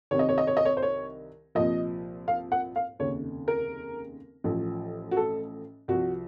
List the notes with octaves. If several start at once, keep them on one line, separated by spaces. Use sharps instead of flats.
C2 C3 D#3 C#5
D#5
C#5
D#5
C#5
D#5
C#5
C5
C#5
C2 A#2 F3 D#5
F5
F#5
F5
F1 D#2 C#3 C#5
A#4
A1 A2 F3
F#4
A4
C2 C3 F3 F#4